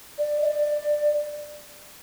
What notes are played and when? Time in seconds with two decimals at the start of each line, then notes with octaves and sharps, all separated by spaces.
0.18 D5
0.42 D#5
0.46 D5